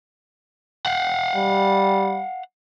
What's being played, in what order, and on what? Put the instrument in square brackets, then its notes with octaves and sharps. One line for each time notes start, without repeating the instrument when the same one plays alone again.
[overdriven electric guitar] F5 F#5
[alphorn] G3